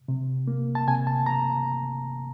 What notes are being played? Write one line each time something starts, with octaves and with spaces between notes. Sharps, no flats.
C3
A#3
A5
C3 G#5
A5
A#5